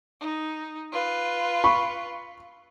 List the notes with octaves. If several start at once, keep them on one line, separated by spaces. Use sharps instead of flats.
D#4
F4 B4
B5 C#6